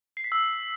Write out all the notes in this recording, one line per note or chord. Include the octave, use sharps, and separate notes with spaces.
C7
B6
E6